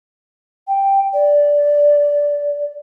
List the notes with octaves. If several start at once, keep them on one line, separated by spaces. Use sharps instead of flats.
G5
D5